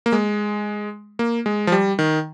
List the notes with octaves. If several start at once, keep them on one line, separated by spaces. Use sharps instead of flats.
A#3
G#3
A#3
G#3
F3
G3
D#3